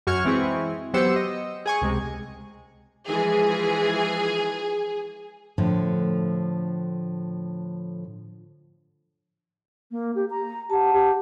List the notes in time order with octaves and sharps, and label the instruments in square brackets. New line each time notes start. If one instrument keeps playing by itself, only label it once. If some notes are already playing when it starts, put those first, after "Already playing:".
[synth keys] F#2 F#4 C#6 F6 G#6
E3 G#3 C4 E4 G#4 C#6
F#3 B3 G4 C5 E6 C#7
D#5
G#4 G#5 C#6
C#2 C3 G#3
[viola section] E3 F3 G#3 [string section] G#4
[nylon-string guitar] A2 D3 F3 A3
[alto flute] A#3
G4
A#5
[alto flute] G4 [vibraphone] F#5 A5
[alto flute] G4